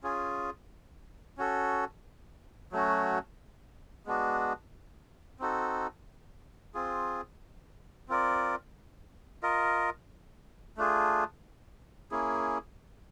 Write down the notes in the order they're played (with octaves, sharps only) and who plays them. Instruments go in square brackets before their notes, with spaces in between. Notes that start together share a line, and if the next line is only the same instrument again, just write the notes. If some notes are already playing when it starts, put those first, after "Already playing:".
[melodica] C#4 F4 G#4
C#4 F#4 A4
F#3 A3 C#4 F#4
G#3 B3 D4 F#4
C4 D#4 F#4 A4
C4 F4 G#4
C4 F4 A#4 D5
F4 A#4 D#5
A3 D4 F4 G#4
A#3 C#4 E4 G#4